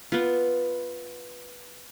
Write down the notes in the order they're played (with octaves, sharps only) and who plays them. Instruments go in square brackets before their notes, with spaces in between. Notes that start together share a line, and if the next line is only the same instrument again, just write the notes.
[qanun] B3 F4